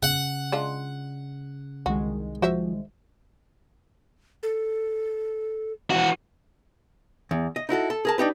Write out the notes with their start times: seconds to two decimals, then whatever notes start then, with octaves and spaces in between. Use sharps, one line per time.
0.03 C#3 F#5
0.52 G#3 D4 F4
1.86 C2 D#3 G#3 F#4
2.42 F3 F#4 C5 E5
4.43 A4
5.90 E3 F#4
7.31 E2
7.56 D#5
7.69 D#4 E4 F#4 A4
7.90 A4
8.05 G#4 A#4 A5
8.18 D4 D#4 G4 B4